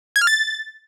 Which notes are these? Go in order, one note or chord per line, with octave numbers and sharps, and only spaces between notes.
G#6
F6
A6